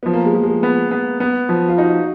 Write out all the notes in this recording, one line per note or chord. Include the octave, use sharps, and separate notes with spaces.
F3 B3
A#3
G#3
F3
G#3
B3
B3
B3
F3
F4
D#4 F#4